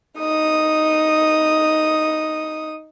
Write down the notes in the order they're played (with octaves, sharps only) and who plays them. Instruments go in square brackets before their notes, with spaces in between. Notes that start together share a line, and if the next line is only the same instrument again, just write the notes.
[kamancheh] D#4 D#6